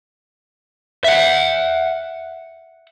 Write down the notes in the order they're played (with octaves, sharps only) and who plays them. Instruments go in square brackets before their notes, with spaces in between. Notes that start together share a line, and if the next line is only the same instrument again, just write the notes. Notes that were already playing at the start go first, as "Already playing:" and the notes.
[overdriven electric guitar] E5 F#5